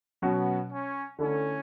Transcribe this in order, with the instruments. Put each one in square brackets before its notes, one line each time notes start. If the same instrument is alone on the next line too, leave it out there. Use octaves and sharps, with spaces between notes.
[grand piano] B2 F#3 C#4 F#4 [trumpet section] B3
[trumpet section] C#4
[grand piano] D3 A3 E4 [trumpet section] C#4